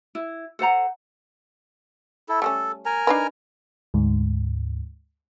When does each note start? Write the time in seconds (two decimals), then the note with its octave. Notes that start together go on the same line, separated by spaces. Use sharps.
0.15 E4
0.59 A4 C5 F#5 A#5
2.29 E4 A4
2.42 G3 A3 C#4 A4
2.86 A#4 G#5 A#5
3.07 D4 D#4 B4
3.94 D2 G#2